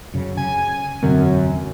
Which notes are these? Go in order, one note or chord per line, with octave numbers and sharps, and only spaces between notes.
F#2 C#3
C#3 G#5
E1 F#2 D3 C4